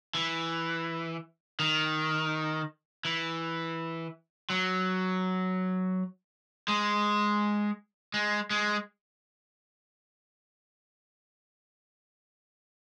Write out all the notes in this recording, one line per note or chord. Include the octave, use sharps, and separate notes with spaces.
E3
D#3
E3
F#3
G#3
G#3
G#3